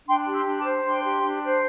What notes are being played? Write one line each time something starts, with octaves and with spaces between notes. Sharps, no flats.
D4 G5 C6
G4
C6 E6
D4
A5 D6
C5
D4 G5 C6
G4
D4
C5